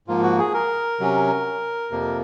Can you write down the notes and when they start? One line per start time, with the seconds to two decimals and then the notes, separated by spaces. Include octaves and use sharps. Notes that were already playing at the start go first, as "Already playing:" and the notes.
0.08 G#2 F3 A#3 F4
0.23 F#4
0.39 G#4
0.54 A#4
1.00 C3 F#3 C#4
1.91 F2 C3 F3 A#3